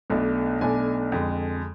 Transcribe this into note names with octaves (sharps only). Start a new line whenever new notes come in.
B1 B2 A3 D4
B1 B2 A3 D4 G#5
F2 D3 G#3